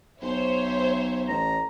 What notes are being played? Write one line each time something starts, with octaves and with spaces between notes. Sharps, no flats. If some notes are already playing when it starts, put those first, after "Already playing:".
B1 C5 C#5 E5
A1 A#5